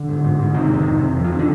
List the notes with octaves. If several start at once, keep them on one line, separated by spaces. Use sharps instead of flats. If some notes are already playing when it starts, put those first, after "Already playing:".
Already playing: D3
G#2
G#2
G#2
C3 D#3
F2 D3
D#3
F2
C3
F2
F3
D#3
D3